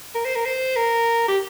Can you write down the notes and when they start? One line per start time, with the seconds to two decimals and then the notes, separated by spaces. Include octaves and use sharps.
0.15 A#4
0.25 C5
0.35 A#4
0.45 C5
0.76 A#4
1.28 G4